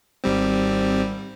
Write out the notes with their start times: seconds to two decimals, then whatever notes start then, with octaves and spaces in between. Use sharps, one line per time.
0.24 G#1 G3 C4